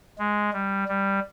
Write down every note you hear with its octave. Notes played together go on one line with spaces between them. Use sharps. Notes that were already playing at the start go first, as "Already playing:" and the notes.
G#3
G3
G3